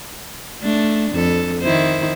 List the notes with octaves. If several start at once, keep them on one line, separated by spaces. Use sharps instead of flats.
A3 D4
F2 A4
D#3 E4 C5